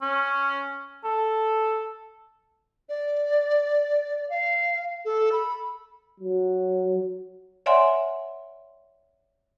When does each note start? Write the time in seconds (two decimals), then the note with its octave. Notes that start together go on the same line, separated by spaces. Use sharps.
0.02 C#4
1.04 A4
2.89 D5
4.30 F5
5.05 A4
5.32 B5
6.20 F#3
7.66 C#5 D5 E5 F#5 G#5 C6